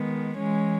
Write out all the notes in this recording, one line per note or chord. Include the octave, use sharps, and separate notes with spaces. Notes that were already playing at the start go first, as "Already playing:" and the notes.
Already playing: D#3 G#3 B3
E3 G#3 C#4